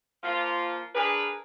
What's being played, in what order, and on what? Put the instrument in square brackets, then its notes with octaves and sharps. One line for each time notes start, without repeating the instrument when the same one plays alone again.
[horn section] F3 A#3 F4
D4 G#4 A#4 B4